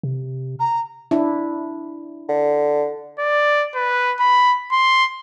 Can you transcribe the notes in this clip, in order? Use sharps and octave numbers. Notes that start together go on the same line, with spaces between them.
C3
A#5
D4 E4
D3
D5
B4
B5
C6